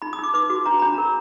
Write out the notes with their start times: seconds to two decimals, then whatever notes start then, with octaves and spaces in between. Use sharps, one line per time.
0.02 D#4 B5
0.13 D#6
0.19 D#4 D6
0.34 B4 D6
0.50 F#4 D6
0.66 D4 A#5
0.79 D4 B5
0.94 A#4 A#5